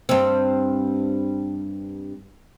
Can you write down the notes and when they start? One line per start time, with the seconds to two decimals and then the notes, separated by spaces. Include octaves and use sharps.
0.09 G2 C4